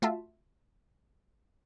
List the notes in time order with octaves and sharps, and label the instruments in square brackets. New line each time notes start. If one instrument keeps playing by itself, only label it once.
[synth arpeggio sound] A3 F4 F#4 E5 A5